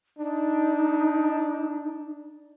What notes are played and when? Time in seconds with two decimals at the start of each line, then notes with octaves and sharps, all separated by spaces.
0.19 D4 D#4